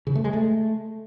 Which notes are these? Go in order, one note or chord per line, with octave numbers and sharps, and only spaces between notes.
C#3
A3
G#3
A3